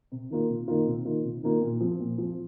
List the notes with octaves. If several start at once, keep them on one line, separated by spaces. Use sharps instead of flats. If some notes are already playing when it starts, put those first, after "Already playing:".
C3
D#3 A#3 F4
C3
D#3 A#3 F4
C3
D#3 A#3 F4
C3
D#3 A#3 F4
A#2
F3 C4
A#2
F3 C4